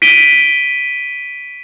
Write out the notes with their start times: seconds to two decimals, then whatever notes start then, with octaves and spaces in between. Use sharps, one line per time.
0.02 B6 D7 D#7 G7